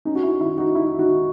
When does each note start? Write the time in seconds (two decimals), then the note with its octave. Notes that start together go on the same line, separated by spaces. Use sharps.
0.05 C#4 D#4
0.15 F#4
0.23 E4
0.40 D#3 E4
0.58 D#4 F#4
0.75 D#3 E4
0.99 D#4 F#4
1.10 D#3